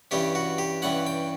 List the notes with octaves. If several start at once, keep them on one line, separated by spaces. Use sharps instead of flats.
G2 E3 G3 C#4 G4
F#4
G4
G2 E3 G3 C#4 F#5
G5